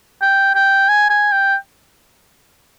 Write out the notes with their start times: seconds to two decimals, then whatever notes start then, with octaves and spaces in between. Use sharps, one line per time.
0.21 G5
0.55 G5
0.89 G#5
1.09 G#5
1.32 G5